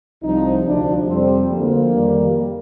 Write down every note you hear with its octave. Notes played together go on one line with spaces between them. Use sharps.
C2 C3 F3 D#4
D2 C3 F3 D4
F2 C3 G3 C4
D2 D3 F3 A#3
F2 D#3 G3